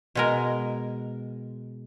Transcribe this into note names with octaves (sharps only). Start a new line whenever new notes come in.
B2 G#3 A#4